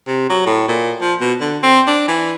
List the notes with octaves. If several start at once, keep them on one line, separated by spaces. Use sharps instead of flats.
C3
F#3
A2
A#2
F3
B2
D3
C4
D4
E3